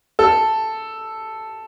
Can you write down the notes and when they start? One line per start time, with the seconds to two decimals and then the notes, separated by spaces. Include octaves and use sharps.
0.19 A4